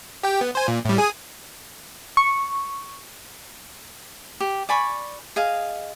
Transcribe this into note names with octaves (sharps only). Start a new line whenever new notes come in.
G4 G5
B3
C5 G#5
A#2
A2 G3
G#4 G#5 D#6
C#6
G4
D5 G#5 B5 C#6
G#4 D#5 F5